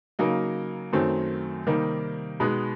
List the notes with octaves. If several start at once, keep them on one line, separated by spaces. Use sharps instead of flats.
C#3 F#3 A#3 D#4
F#2 D#3 F#3 A3 C4
C3 D#3 G3 A#3 D#4
B2 G#3 B3 D#4